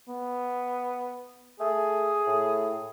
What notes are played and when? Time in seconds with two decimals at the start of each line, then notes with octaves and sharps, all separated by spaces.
0.08 B3
1.60 A3 G#4
2.27 A2